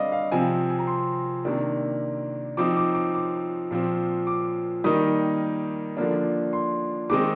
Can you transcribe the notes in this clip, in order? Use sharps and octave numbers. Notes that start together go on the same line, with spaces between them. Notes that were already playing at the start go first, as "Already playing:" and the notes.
Already playing: D3 G3 C4 D5 D#5 F5
F5
C3 F3 C4 G#5
G#5
A#5
C6
C3 D#3 A#3 D4
F3 C4 D#4 D6
D6
D6
D6
A#2 F3 C4
D6
D#3 G3 A#3 D#4 D#6
D3 F3 A#3 D4
C6
D#3 G#3 C4 D#4 D6